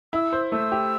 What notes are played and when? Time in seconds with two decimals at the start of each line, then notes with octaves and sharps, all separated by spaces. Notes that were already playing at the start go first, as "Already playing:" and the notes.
0.13 E4 E6
0.33 C5
0.52 A3 E6
0.72 G4